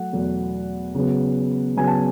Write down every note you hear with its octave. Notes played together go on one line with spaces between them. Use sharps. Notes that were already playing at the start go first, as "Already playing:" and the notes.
Already playing: F#3 A3 F#5
E2 B2 F#3 A3
C#3 F#3 B3
C#3 F#3 B3 G#5
A5